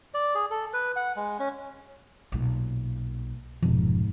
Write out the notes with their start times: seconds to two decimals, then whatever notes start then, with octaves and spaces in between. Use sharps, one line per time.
0.14 D5
0.35 G#4
0.51 A4
0.73 B4
0.96 F#5
1.16 G#3
1.39 C#4
2.32 B1 A#2
3.62 F1 G#2 B2 F3